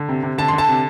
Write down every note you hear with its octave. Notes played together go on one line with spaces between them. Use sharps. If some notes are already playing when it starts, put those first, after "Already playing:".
Already playing: D3
C3
C3
D3 A5
C6
D3
A5
C3